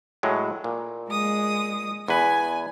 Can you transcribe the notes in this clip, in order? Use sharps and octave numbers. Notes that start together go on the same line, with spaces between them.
A2 F#3 G#3
A#2
G#3 D#6
E2 B4 G#5